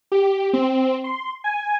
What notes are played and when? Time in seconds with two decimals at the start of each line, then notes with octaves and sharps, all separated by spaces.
0.12 G4
0.53 C4
1.04 C6
1.44 G#5